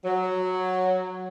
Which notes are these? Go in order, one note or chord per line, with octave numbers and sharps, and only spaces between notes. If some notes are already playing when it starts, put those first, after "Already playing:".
F#3